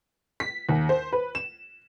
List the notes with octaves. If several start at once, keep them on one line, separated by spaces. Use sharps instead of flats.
B6
D#2
C5
B4
E7